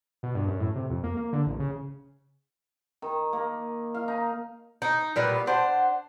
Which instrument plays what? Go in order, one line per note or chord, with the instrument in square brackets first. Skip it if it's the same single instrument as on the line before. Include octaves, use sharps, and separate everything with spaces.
[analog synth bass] B2
G2
F#2
A2
C3
F2
A#3
A#3
D3
A1
C#3
[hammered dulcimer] D#3
A#3
F5
D#4
[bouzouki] D#4
A#2 G3 B3
[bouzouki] D4 C5 [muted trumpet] F#5